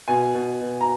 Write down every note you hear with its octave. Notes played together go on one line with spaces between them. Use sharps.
B2 G#5
B2
B2
A#5